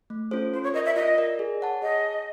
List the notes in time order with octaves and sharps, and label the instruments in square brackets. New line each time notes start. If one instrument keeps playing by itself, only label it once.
[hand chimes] A3
C#4 F4 A4 C5
[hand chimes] F4 [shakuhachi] C5
[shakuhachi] C#5
[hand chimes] A#4 [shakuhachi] D#5
[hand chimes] D5
[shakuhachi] E5
[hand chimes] F4 [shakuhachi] D#5
[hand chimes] A#4 D5
G#4
C#5 F#5 A5
[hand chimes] G#4 [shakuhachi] D#5